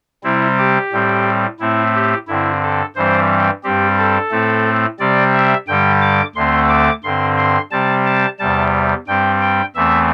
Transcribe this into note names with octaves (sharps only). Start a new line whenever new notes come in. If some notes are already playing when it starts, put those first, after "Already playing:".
C3 G3 C4 E4
G4
A2 G3 C4
A2 A3 C4 E4
G4
G2 D3 C4 E4
A4
G2 E3 G3 C4 C5
G2 G3 C4 G4
A4
A2 A3 C4
C3 G3 C4 D5
E5
G2 D3 G3 G5
D6
D2 D3 A3 C4 C6
D6
G2 D3 C4 C6
C6
C3 G3 C4 A5
A5
E2 C3 G3 A5
G2 G3 C4 G5
G5
E2 E3 A3 C4 E5